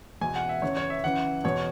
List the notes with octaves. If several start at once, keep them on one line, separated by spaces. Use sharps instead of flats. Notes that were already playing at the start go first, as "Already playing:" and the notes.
E2 B2 G#5
F#5
E5
E2 C#3 E3 C#5
C#5
E5
F#2 C#3 E3 F#5
E2 B2 C#5